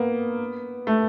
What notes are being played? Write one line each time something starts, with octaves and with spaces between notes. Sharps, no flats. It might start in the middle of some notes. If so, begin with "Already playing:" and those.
Already playing: A#3 B3
A3